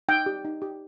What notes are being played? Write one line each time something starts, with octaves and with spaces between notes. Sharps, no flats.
D#4 G5
G4
D#4
G4